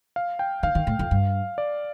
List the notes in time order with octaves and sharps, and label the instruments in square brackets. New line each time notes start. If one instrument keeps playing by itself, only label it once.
[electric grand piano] F5
G5
[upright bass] D#3 [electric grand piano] F5
[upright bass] D#3
A2
F2
G2
[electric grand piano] D5